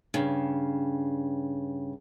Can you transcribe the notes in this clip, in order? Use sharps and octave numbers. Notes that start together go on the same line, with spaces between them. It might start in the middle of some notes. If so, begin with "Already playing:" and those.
G2 C#3